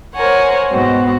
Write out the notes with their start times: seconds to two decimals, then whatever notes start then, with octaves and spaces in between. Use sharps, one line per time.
0.14 A#4 C5 C#5 F#5 G#5
0.71 G#2 B2 B3 C4 F#4